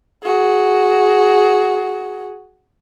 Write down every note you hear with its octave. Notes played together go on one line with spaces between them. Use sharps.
F#4 G#4